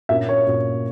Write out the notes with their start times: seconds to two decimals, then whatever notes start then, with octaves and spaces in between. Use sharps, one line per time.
0.09 A#2 A#3 C#4 E5
0.29 C#5
0.47 A#2 A#3 C#4